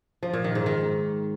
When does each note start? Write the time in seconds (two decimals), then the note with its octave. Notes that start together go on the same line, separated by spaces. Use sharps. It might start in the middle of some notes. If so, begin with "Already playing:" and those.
0.23 F3
0.33 A#2
0.44 D#3
0.55 G#2
0.66 D#3